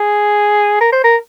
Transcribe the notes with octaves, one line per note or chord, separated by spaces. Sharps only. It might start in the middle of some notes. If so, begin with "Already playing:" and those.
Already playing: G#4
A#4
C5
A#4